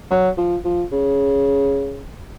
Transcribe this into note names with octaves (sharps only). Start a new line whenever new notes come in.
F#3
F3
F3
C#3